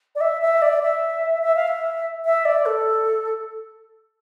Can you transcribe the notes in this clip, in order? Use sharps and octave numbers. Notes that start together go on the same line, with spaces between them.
D5
E5
E5
D5
E5
E5
F5
E5
E5
D5
A4